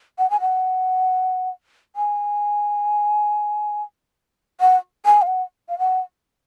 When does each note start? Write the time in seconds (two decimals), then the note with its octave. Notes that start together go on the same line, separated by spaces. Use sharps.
0.18 F#5
0.30 G#5
0.40 F#5
1.96 G#5
4.60 F#5
5.05 G#5
5.22 F5
5.27 F#5
5.69 F5
5.79 F#5